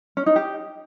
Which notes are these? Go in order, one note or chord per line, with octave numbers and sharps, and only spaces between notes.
C#4
D#4
G4